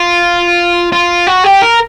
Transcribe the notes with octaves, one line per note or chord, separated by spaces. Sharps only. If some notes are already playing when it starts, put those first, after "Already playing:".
Already playing: F4
F4
F#4
G4
A#4